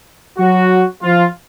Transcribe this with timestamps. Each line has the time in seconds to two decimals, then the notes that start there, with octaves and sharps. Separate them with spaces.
0.38 F#3 F#4
1.03 F3 F4